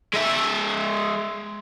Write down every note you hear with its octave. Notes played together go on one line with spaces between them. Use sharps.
G#3 E5